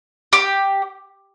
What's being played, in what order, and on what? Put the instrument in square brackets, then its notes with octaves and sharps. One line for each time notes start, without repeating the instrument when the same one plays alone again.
[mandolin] G4